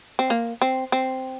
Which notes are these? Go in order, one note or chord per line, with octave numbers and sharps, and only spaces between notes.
C4
A#3
C4
C4